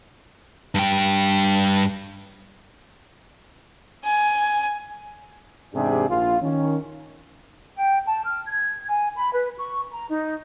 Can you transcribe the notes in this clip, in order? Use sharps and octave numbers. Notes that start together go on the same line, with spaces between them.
G2 G5
G#5
E2 G#2 C3 D4 G4 G#4
A#1 F4
D#3 C#4
G5
A5
F6
G#6
G#5
B5
B4
C#6
A#5
D#4